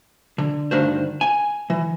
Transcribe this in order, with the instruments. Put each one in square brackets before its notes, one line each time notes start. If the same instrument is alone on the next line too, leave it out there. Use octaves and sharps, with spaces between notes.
[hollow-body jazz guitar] D3
D2 G2 D#3 D4 C5
G#5
E3